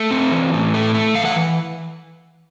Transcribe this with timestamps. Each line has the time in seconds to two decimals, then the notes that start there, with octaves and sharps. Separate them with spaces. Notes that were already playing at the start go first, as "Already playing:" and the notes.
Already playing: A3
0.11 C4
0.32 E3
0.53 A2
0.74 A3
0.94 A3
1.15 E3 F5
1.25 F#5